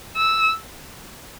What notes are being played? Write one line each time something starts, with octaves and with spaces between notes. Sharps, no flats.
E6